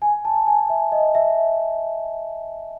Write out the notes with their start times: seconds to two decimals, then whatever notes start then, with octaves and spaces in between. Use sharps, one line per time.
0.02 G#5
0.25 A5
0.47 G#5
0.70 E5
0.92 D#5
1.15 E5